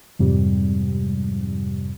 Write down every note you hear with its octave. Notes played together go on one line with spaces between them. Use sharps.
F2 G#2 C3 G3